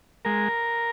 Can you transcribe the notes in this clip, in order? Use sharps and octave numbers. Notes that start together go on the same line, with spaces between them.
G#3 A#4